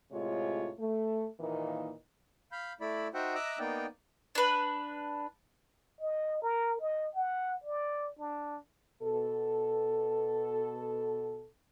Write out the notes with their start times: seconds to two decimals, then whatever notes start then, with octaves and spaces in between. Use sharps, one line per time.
0.12 A2 C3 G#3 F4 C#5
0.79 A3
1.40 A#2 D#3 E3 A#3 D#4
2.52 F5 B5 G6
2.81 A3 E4 D5 B5
3.14 D#4 F#4 C5 E5 F#5 G5
3.35 D#5 E5 A#5 D6 E6 F#6
3.59 A#3 B3 D#4 D5 G5
4.35 D4 B4
6.01 D#5
6.42 A#4
6.80 D#5
7.15 F#5
7.64 D5
8.19 D4
9.02 B2 A4